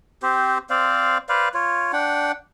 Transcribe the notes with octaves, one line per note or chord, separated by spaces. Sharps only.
C4 G4 C5
C4 C5 D5 F5
B4 C5 D5 F5
F4 C#5
D4 F#5 G5